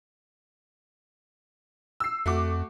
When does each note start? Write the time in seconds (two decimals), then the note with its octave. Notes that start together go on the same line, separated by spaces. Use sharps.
2.00 E6 C7
2.26 F2 A3 F#4 D6